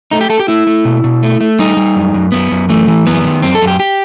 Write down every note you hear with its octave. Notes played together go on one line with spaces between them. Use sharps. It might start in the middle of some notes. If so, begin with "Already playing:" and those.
A3 D#4
G4
A3 A4
G4
A3 E4
A3
B2
B2
A3
A3
G3 D#4
G3
F#2
F#2
F#2 B3
F#2
E3 A3
E3
F#2 B3
D#3
F#2 C4
A4
F#2
G4
G4